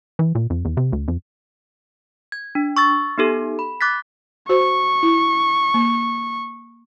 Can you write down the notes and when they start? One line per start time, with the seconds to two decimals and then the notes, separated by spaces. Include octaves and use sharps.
0.19 E3
0.35 A#2
0.50 F2
0.65 E2
0.77 C3
0.92 D2
1.08 F2
2.32 G#6
2.55 D4
2.77 C#6 E6 A6
3.18 B3 D#4 G4 A4
3.59 B5
3.81 D6 F#6 A6 B6
4.49 F#4 C5 C#6
5.03 E4
5.74 A#3